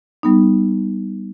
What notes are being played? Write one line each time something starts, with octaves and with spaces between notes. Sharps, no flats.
G3 B3 D#4